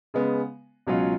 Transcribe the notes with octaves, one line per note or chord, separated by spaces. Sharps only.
C#3 G#3 B3
C#2 B2 F#3 C#4 F4